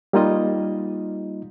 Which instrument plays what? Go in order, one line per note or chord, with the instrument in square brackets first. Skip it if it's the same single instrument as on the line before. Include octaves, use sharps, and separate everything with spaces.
[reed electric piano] G3 A#3 D#4 F4 D#5